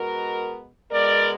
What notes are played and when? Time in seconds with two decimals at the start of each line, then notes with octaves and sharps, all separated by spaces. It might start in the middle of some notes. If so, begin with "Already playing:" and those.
Already playing: B2 G#3 B3 F#4 A#4
0.91 B2 G#3 B3 A#4 D5